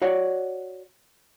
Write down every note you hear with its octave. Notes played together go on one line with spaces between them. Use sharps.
F#4 C#5 D5 F#5